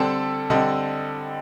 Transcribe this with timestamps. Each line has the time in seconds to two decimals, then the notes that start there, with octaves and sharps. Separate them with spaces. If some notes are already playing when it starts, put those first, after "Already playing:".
Already playing: D3 G3 C4 A4
0.50 D3 G3 C4 D#5